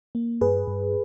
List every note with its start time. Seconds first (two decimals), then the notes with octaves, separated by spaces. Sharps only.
0.15 A#3
0.41 G2 G#4 B4
0.68 G2